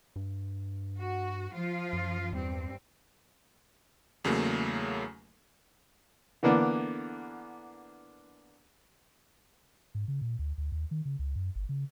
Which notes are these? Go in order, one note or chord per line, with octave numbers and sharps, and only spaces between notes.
G2
F#4
F3 F4
F#2
E2 G2 C4
E2 C#3 F#3 A3 A#3
D3 E3 A#3 B3 D4
G#2
C#3
A#2
D2
D2
D#2
D#3
C#3
C#2
F#2
G1
C#3